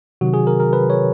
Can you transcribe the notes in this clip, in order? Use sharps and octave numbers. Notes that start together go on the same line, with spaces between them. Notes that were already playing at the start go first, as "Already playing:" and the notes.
C3 D#3 F#3 F#4
G#4
A#4
A#4
B4
C#5